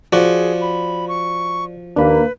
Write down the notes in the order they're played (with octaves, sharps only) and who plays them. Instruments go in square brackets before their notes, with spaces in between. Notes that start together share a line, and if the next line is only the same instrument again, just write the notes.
[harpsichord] F3 F#4 [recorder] G#4 [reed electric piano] D5
[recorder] B5
C#6
[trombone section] D#2 A#3 [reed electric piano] D4 B5 [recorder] B4